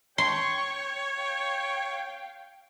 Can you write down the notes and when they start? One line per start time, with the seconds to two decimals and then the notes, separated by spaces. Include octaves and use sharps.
0.18 C#5 G5 C6 C#6
1.15 F5 G5